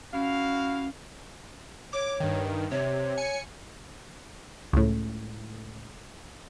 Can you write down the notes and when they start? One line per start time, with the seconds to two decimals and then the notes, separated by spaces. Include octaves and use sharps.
0.13 C#4 E4 F#4 F5
1.93 C#5 D6
2.20 G2 D#3
2.71 C3 C#5
3.17 G#5 C#7
4.73 C#2 A2